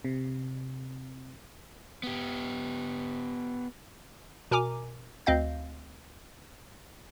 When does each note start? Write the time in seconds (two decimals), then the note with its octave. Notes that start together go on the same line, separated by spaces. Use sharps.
0.05 C3
2.03 B3 G4
4.51 B2 A#4 G#5 A#5 D6
5.26 D2 C4 D#5 F5 G6